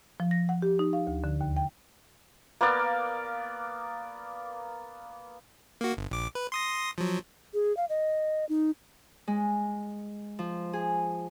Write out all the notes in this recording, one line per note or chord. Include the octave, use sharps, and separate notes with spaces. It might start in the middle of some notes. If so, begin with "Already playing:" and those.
F3
A#6
F#5
G4
D#4
F5
D2
D3
D#2
G5
A#3 B3 D5 F5
A#3 F#4
G1
A#1 D6
B4
C6 D#6 A#6
F3 F#3
G#4
F5
D#5
D#4
G#3
F3
G#4